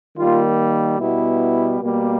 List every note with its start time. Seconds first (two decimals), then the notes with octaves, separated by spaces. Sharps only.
0.17 D#3 G3 A#3 F4
0.99 B2 G3 B3 E4
1.81 B2 G3 A#3